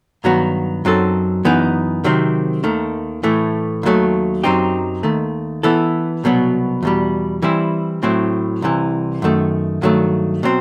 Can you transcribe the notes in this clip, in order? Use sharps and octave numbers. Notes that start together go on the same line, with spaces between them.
G2 D#3 F#3 B3 F#4
F#2 F#3 C4 D#4 A4
F#2 E3 B3 D#4
C3 D#3 F#3 C4
D#2 D#3 A3
A2 E3 A3
D#2 D#3 F#3 A3
F#2 F#3 C4 D#4 G4
D#2 D#3 A3
E3 B3 E4 A4
C2 B2 F#3 B3
E2 B2 G3
E3 G3 C4 E4
A2 F#3 C4 E4
C2 C3 E3
F#2 D#3 A3
G2 D#3 F#3 A3
B2 F#3 C4